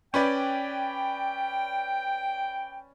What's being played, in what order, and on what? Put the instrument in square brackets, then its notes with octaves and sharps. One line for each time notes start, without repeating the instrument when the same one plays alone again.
[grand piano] C#4 B4 D5 [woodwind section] G5